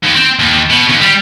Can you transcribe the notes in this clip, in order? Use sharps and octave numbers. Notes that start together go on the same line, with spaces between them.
D#2
C4
D#2
B2
D#2
G3